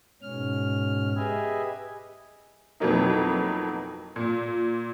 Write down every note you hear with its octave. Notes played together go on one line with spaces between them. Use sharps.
G#2 B2 C#4 F6
G4 G#4 B4 D#5 E5 G#5
F2 B2 E3 F#3 A#3 D#4
A#2